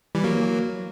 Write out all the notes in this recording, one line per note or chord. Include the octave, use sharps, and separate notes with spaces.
E3 G3
F#3 A#3